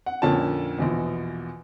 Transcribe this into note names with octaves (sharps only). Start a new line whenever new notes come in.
F#5
F2 A#2 D3 C#4 A5
A#1 E2 B2